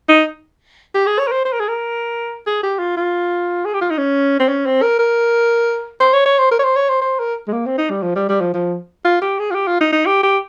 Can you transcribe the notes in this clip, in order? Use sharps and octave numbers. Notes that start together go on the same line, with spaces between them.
D#4
G4
G#4
C#5
A#4
C5
C5
A#4
G#4
A#4
G#4
G4
F4
F4
G#4
G4
F4
D#4
C#4
C4
C#4
C4
A#4
A#4
C5
C#5
C#5
C5
A#4
C#5
C5
C#5
C5
C5
A#4
G#3
A#3
C4
D#4
G3
F3
G3
G3
F3
F3
F4
G4
G#4
F4
G4
F4
D#4
D#4
G4
G4